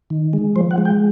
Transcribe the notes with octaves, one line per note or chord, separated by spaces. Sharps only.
D#3
G#3
F3 C5
F#5
G#3
G5